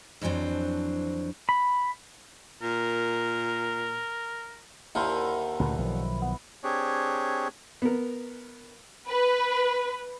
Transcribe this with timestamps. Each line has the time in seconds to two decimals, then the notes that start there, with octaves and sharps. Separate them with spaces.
0.21 F2 E3 F#3 C4 D4
1.49 B5
2.62 A#2 A#4
4.95 D#2 D3 E4 A#4 C5
5.60 D2 A#2 C#3 B4
5.78 B1 D#3 F3
6.22 B3
6.64 C4 D4 G4 G#4 C#5
7.82 B3 A#4
9.09 B4